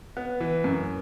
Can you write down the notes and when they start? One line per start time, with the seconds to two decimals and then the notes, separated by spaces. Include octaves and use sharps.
0.17 B3
0.40 E3
0.64 F#2